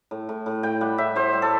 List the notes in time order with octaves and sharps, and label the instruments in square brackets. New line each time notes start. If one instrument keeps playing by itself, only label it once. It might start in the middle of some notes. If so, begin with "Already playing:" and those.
[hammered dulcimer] A2
A2
A2
A2 G5
G3 F#5
A2 E5
A2 C5
G3
A4